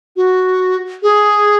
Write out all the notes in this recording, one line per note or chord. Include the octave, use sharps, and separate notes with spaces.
F#4
G#4